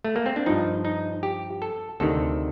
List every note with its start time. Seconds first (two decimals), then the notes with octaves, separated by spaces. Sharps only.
0.05 A3
0.16 A#3
0.26 C4
0.36 D4
0.46 G2 F3 D#4
0.85 D#4
1.23 G4
1.62 A4
2.00 D2 C3 D#3 A4